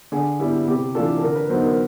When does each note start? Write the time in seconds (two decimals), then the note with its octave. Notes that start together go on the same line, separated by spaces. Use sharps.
0.12 D3 G#4
0.39 G3 B3 E4
0.68 C3 G4
0.95 E3 A3 D4 F4 A4
1.17 A4
1.22 D3 A#4
1.35 B4
1.50 F#3 B3 D#4 C5
1.64 A#4